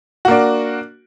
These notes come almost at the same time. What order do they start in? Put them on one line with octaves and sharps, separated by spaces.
F#4 A#3 D4